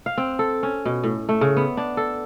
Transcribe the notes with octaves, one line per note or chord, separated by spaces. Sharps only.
F5
C4
A4
C#4
B2
A2
A3
C#3
B3
D4
A4